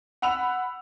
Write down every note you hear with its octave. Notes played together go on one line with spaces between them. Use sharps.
F#5 B5 E6 F7